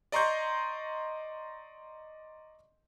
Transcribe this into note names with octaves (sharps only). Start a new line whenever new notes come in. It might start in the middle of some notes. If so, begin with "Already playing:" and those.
D5 D#5 A#5 C6 C#6 G6